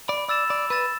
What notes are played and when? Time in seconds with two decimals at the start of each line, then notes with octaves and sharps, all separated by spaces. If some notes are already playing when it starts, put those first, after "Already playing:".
0.08 D5 B5
0.29 D5 E6 A6 E7
0.50 D5 B5
0.70 B4 E6 A6 E7